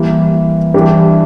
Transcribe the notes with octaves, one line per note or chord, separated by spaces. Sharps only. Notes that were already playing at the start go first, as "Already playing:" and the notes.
Already playing: E3 G3 A#3
E3 G3 D4 G4